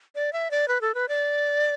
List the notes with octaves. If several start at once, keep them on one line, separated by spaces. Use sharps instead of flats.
D5
E5
D5
B4
A4
B4
D5